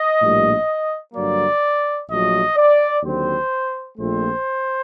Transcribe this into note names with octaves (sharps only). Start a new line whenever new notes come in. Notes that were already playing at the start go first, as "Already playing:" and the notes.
Already playing: D#5
A#1 A2 G3 A#3
G2 D3 F#3 A#3 D5
A#1 A#2 F#3 A3 D#5
D5
D#2 D3 F#3 C4 C5
A#1 A#2 A3 C4 C5